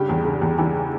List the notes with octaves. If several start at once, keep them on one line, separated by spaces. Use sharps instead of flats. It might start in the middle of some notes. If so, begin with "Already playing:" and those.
Already playing: G2 C#3 G4
E2
C#3
E2
E3 G4